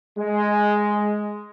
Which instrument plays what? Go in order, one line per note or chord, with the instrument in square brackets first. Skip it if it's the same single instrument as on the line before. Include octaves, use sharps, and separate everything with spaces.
[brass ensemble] G#3